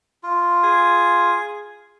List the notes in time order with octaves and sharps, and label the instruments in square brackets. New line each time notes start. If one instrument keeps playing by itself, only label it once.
[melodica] F4
[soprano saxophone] G#4